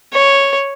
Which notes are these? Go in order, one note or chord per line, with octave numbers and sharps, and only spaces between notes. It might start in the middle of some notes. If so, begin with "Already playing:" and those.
C#5